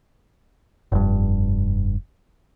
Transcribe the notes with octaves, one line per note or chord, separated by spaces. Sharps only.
F1 G2